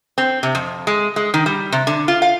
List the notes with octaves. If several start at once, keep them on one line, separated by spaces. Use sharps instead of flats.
C4
C3
F2
G#3
G#3
D#3
G3
C3
D3
F4
F5